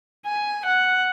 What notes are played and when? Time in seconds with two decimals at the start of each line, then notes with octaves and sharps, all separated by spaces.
0.26 G#5
0.65 F#5